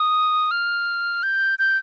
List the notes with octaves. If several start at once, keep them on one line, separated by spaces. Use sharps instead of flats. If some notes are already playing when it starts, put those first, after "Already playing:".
Already playing: D#6
F6
G6
G6